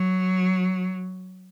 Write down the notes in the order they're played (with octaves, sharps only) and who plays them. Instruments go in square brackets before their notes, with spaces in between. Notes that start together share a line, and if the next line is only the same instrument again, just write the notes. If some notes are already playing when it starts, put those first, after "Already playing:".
Already playing: [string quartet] F#3